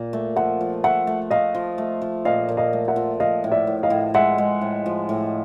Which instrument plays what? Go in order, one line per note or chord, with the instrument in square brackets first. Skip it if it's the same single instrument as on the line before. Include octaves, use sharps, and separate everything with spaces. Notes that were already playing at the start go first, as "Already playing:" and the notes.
Already playing: [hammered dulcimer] A#2
A3
[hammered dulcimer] F3 [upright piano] E5 F#5
[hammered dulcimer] F3
[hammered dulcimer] A3 [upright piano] E5 F#5
[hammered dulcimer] A3
[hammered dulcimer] A3 [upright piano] D#5 F5
[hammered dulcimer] F3
A3
F3
[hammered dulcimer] A#2 [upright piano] D#5 F5
[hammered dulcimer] A#2
[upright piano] D#5 F5
[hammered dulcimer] A3
[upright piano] E5 F#5
[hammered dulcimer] F3
[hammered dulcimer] F3 [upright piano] D#5 F5
[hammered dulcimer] A2
[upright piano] D5 E5
[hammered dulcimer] A2
[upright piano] D#5 F5
[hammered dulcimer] A2
[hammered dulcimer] G#3 [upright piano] E5 F#5
[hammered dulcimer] G#3
A2
F3
A2